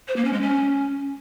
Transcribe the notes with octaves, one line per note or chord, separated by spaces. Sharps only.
C5
A#3
C#4
G#3
C#4